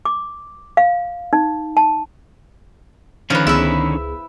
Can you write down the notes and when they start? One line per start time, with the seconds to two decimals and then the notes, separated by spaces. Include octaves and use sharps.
0.05 D6
0.77 F5
1.33 D#4
1.77 A5
3.30 D3 D#3 F3 C#4 B4
3.47 C#2 B3 E4 G#4 E5